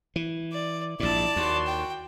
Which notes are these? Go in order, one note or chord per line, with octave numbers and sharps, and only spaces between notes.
E3
D5
A#1 G#2 E4 D5 A5
D#2 F#4 C6
G5